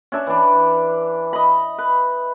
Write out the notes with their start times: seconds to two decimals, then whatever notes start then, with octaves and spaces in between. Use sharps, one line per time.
0.12 C#4 D4 E5
0.27 E3 D4
1.33 D#5 B5
1.78 B4